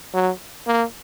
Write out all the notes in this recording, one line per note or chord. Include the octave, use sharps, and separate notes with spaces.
F#3
A#3